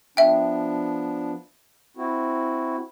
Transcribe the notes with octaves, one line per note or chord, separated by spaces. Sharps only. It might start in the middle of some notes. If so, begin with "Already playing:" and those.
F3 B3 D4 E5 G5
C4 E4 F#4